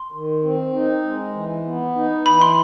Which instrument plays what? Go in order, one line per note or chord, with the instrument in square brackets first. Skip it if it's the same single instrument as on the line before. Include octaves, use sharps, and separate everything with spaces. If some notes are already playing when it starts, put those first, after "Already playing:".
Already playing: [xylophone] C6
[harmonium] D#3
C4
D#4
G#3
E3
B3
D#4
[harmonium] E3 [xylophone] B5
[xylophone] C6